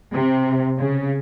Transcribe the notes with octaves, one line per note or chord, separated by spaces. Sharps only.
C3
C#3